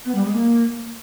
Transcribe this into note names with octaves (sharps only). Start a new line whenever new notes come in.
B3
G3
G#3
A#3